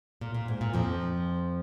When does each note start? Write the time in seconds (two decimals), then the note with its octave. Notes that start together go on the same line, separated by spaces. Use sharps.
0.21 A#2
0.35 A#2
0.48 G#2
0.61 A#2
0.73 F2 F3